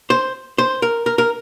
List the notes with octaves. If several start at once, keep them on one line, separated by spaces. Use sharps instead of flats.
C5
C5
A#4
A#4
A#4